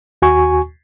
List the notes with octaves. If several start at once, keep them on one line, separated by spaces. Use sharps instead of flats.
D#2 F#4 G#5 C#6